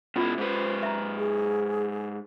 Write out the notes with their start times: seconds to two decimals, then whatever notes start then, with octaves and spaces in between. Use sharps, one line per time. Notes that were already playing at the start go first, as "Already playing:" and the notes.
0.16 B2 C#4 E4 F4
0.38 G#2 B4 C5
0.83 E5 A#5
1.18 G#4